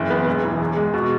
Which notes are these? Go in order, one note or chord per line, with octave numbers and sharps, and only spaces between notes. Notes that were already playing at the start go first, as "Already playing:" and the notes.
Already playing: F#1 E3
B3
E1
E3
E2
G#3
B2